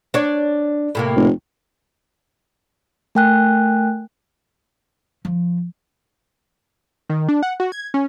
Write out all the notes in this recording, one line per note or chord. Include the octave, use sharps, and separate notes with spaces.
D4 C#5
A2 C3 A#3
F1
A3 A#4 G5 G#5 F#6
F3
D#3
D4
F#5
F#4
G#6
C#4